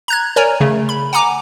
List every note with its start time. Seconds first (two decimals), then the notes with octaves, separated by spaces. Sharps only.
0.08 A#5 F#6 G#6
0.36 A#4 C#5 D5 G#5 A#5
0.60 C#3 A3
0.89 B5
1.13 F#5 G#5 A#5 D6